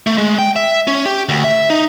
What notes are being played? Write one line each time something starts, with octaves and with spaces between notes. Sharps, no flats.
A3
G#3
G5
E5
C#4
G4
D2
E5
D#4